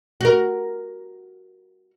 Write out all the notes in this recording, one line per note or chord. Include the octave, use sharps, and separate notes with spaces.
F#4 A#4